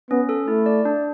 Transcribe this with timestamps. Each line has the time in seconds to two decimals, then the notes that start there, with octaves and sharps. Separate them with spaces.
0.10 B3 C#4
0.29 A4
0.48 A3 E4
0.66 D5
0.85 D4